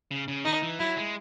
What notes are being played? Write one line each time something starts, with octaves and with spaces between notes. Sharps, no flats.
C#3
C#3
D#3 D#4
E3
F#3 E4
G#3